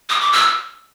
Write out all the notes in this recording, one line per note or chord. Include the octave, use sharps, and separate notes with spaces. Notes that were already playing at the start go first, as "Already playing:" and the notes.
D#6
D6
E6